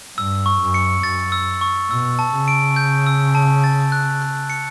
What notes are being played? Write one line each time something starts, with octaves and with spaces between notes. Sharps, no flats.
G2 E6
C#6
F#2
C#7
F#2 A6
E6
C#6
B2 E6
A5
C#3
D7
G6
E6
A5
A6
F#6
F#6
C#7